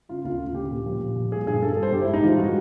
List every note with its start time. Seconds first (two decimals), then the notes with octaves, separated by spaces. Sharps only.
0.09 C#3 F4
0.25 D2 F4
0.40 C#3
0.55 D2 G4
0.71 A#2
0.86 F3
1.01 F3
1.16 A#2
1.31 G3 G#4
1.46 G2 G#4
1.62 G2 A4
1.73 A4
1.78 G3 C5
1.92 G2 G4
2.02 E4
2.08 G#3
2.14 D#4
2.23 E3 F4
2.38 G#3 F#4